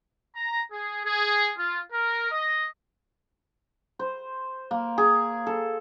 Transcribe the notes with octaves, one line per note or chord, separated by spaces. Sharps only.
A#5
G#4
G#4
F4
A#4
D#5
C5
A#3
G#4
A4